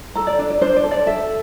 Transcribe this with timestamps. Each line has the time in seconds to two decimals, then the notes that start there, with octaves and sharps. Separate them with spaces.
0.15 A4 A#5
0.27 D5
0.39 D4 D5
0.50 D5
0.61 D4 C5
0.76 D5
0.84 A4
0.91 D5
1.06 A4 E5